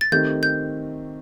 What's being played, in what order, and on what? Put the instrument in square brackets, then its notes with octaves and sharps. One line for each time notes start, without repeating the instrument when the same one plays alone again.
[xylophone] A6
[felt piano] D#3 A3 C4 G4 [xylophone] G6
[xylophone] G6